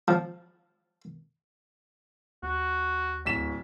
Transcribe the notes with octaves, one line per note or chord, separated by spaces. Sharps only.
F3
D#2 F#4
D1 B6 E7